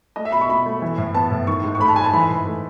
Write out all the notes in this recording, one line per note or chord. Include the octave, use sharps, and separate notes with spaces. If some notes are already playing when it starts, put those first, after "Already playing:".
A3 D#5
E5
B2 B5
C#6
B2 B5
A3
E3
A2
B3 A5
A2
D#3 C#6
G#2
C#6
A3 B5
A5
G#2 G#5
A5
E3 B5
A2
A3